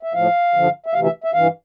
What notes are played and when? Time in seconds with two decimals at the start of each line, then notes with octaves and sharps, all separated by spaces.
0.03 E5
0.13 A2 F3 F5
0.54 G2 D3 F3
0.86 E5
0.93 D2 C3 E3 F5
1.04 E5
1.24 E5
1.34 G2 E3 F5